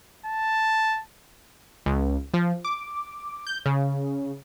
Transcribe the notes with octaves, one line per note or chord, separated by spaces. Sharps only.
A5
C#2
F3
D6
G6
C#3